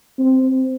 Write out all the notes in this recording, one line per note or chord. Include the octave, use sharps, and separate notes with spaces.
C4